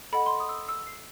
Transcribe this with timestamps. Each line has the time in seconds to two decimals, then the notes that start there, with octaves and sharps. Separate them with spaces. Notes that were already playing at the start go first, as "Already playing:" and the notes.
0.12 A4 D#5 F#5 B5
0.26 C6
0.40 D#6
0.49 E6
0.54 D#6
0.68 E6
0.87 C7